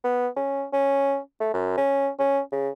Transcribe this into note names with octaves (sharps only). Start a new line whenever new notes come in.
B3
C#4
C#4
A3
F#2
C#4
C#4
C#3